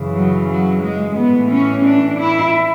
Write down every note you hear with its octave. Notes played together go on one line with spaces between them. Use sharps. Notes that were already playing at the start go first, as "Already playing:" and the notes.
Already playing: F#2 C#3 E3
F#3
F#3
G#3
A2 E3 B3
C#4
D4
E4